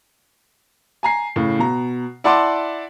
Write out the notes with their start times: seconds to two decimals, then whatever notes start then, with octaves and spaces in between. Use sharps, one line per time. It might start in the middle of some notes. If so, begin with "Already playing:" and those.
1.03 G#5 A#5 C7
1.36 A2 C#3
1.59 B2 A#5
2.24 E4 D5 F#5 A5 C6 D6